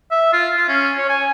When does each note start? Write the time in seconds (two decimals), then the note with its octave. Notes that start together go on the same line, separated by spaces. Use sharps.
0.11 E5
0.33 F4
0.57 F4
0.69 C#4
0.98 C#5
1.09 G#5